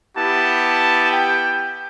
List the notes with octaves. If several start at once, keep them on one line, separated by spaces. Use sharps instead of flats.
B3 E4 G4 A5
G5